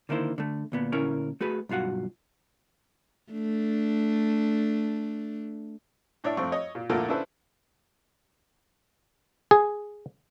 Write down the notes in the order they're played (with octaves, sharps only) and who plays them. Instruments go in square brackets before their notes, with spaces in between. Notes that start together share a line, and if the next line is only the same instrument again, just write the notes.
[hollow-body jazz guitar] D3 D#3 A#3 E4 C5
D3 A3
D2 A#2 B3
D2 A#2 C#4 E4 A#4 C#5
A3 F#4 G#4 B4
B1 G2 F4 F#4 F#5
[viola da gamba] A3 D4
[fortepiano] A2 D4 C#5 D5 E5
F2 A3 C4 C#6
C#5 D#5
A#2
A#2 D3 F3 A3 A#3 E4
C#4 D4 E4 A4 B4 C5
[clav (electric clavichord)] G#4